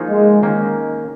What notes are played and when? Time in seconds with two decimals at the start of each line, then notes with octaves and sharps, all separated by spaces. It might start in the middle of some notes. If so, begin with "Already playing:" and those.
Already playing: F3 A#3 D#4 G#4 C#5
0.10 G#3
0.43 D#3 A#3 C#4